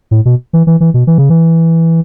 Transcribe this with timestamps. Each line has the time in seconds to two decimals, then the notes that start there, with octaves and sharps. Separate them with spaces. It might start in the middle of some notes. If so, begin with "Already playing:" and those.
0.11 A2
0.25 B2
0.53 E3
0.67 E3
0.80 E3
0.94 B2
1.07 E3
1.18 C#3
1.30 E3